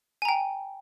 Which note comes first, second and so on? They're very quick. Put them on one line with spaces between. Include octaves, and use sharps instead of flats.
G#5 A#5 G5